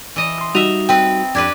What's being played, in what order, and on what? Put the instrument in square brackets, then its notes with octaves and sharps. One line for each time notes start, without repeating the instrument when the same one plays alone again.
[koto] E3 D#5
[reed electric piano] C6 D#6
[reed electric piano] G3 D#4 F#4 [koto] D#5 E5 [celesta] F7
[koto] C4 B4 [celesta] G5
[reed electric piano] F2 G#6 [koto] D4 G4 B4